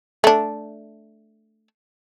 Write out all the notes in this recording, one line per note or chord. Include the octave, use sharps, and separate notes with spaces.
A3 D4